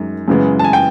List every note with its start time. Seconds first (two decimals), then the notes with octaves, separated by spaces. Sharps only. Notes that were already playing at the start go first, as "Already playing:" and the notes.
Already playing: F#2 D#3 G#3
0.28 F#2 C#3 E3 G#3 B3
0.59 A5
0.64 G#5
0.73 G5